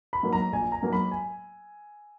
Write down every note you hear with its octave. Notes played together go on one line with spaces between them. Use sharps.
B5
G#2 F#3 A#3
A#5
A#1 G#5
A#5
G#2 F#3 A#3
B5
G#5